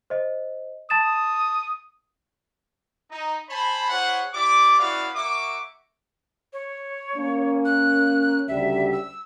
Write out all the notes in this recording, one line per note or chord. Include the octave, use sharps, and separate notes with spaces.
C5 D#5
A5 D#6 A6 E7
D#4
C5 G#5 A5 B5
E4 G#4 C5 C#5 F#5
E4 G4 D5 D6
B3 C#4 E4 F#4 D5 F5
A#3 F#4 E5 C#6 D6
C#5
A#3 C#4
F#6
D2 C#3 G3 E5
E6